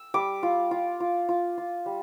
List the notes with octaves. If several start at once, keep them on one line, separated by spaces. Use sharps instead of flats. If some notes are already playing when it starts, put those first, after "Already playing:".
Already playing: E6
G3 D6
F4
F4
F4
F4
F4
G3